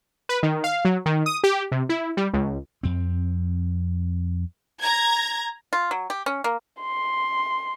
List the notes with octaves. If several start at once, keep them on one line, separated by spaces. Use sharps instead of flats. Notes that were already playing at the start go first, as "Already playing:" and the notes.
B4
D#3
F5
F#3
D#3
D#6
G4
C3
E4
G3
C#2
F2 C4
A#5 G#6
F4
F#3
G4
C#4
A#3
C6